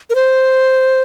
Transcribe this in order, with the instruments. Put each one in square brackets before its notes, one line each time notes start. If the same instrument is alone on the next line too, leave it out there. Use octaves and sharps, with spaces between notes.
[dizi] A#4
C5